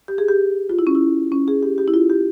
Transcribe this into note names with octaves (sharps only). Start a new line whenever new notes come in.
G4
G#4
G4
F4
E4
C#4
E4
C#4
G#4
G4
G4
E4
F4
G4